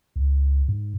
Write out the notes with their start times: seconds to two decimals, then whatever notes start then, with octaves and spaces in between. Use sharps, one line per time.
0.16 C#2
0.68 G#2